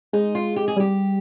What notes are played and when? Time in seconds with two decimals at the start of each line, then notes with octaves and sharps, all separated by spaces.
0.13 G#3 D#4
0.35 F4
0.56 G4
0.68 G#4
0.77 G3 G4